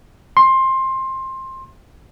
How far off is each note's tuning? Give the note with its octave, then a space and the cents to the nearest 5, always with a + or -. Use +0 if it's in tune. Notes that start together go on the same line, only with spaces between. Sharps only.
C6 +20